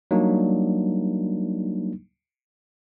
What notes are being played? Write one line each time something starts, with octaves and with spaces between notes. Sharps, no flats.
F#3 G3 A#3 D4 D#4